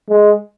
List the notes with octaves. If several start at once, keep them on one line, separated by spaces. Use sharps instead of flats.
G#3